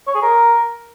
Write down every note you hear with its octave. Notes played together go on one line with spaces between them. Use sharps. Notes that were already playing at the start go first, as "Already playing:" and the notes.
C#5
G#4
A#4